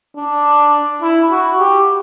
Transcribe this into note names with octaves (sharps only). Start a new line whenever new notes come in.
D4
E4
F#4
G4